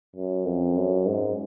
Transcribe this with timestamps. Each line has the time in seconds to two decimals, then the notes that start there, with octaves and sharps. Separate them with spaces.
0.15 F#2
0.46 F2
0.76 F#2
1.06 G#2